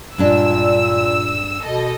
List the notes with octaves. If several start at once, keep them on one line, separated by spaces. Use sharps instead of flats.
G2 A#2 G#3 D4 E6
B2 A4 D#5